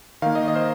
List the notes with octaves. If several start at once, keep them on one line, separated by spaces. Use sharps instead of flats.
D#3 A#3 F5
D#5
D#5
C5